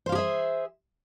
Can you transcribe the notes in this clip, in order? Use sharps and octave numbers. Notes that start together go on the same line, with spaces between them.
G4 G#4 C5 E5 F5